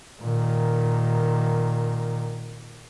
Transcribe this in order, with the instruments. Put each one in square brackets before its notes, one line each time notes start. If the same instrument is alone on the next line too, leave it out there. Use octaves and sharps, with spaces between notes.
[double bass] A#2 D#3